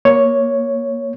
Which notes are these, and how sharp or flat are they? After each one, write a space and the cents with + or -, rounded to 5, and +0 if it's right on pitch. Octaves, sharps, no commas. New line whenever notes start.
A#3 +15 C#5 +0